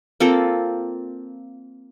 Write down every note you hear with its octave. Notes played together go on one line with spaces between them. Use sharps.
A#3 C4 F4 A4